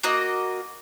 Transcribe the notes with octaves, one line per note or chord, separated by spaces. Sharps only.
A#3 F#4 D#5